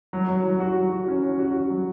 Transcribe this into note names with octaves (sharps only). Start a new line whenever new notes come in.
F#3
F#3
F#3
F#4
F#3
F#4
C#4
C#4
F#4
F#4
F#3